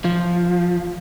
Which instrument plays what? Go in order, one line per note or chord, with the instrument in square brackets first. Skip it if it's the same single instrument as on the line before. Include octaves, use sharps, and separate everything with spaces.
[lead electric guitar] F3